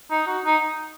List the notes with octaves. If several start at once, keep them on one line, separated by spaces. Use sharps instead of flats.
D#4
F#4
D#4